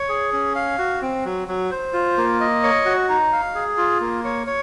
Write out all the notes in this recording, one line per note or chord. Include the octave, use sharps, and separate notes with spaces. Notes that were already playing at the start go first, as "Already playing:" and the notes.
Already playing: C#5
G#4
C#4
F5
F#4
C4
F#3
F#3
C5
F4
A#3
D#5
C#5
F#4
D#4
F5
G#4
F4
A#3
C#5
C#5